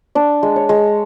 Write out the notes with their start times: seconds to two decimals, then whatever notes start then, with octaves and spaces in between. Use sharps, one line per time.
0.15 D4 D5
0.43 G#3
0.56 C#5
0.69 G#3